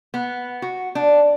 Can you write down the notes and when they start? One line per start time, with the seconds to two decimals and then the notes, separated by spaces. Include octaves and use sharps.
0.14 B3
0.62 F#4
0.95 D4